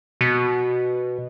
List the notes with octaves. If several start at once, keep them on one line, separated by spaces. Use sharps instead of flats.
B2